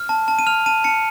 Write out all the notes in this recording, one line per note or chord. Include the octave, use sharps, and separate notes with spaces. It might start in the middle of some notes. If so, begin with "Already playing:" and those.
Already playing: F6
A5
A5
D#7
F6 F7
A5 D#7
A5 C#7